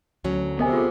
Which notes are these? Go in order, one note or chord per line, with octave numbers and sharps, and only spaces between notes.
D2 F#3 C#4
C3 B3 A#4 D#5 G#5
F4 G#4 A4